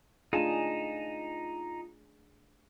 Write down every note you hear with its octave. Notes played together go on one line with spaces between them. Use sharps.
A3 D4 D#4 F4 G#4 G#5 A5